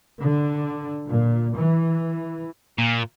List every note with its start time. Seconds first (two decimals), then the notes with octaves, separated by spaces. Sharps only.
0.22 D3
1.09 A#2
1.55 E3
2.78 A#2